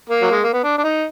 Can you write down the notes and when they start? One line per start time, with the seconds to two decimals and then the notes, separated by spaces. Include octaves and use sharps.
0.09 A#3
0.22 F#3
0.31 G#3
0.43 A#3
0.53 B3
0.64 D4
0.78 D4
0.84 D#4